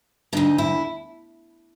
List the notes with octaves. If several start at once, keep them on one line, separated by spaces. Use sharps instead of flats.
D2 D3 D#4
E4